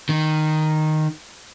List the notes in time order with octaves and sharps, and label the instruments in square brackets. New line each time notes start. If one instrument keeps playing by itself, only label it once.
[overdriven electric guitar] D#3